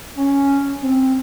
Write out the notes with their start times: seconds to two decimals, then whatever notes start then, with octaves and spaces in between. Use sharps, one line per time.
0.17 C#4
0.81 C4